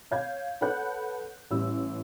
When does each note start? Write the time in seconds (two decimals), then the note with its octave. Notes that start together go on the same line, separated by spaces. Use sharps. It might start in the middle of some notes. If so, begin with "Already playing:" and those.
0.11 C#5 F5 G6 G#6
0.61 A4 B4 C#5 F#5 F#6 G6
1.51 A1 G3 E6